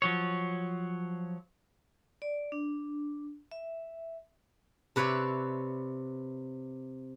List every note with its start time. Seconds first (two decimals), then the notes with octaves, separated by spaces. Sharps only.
0.02 F3 F#3 C#5
2.22 D5
2.52 D4
3.51 E5
4.96 C3 B4 C#5 D5 E5